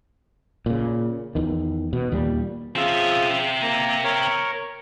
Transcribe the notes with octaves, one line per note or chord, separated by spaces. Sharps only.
A#2 C#3
E2 D#3
B2
D#2 A#2 G3
C#3 F3 C4 F4 E5
A#3 A#5
A#4 C#5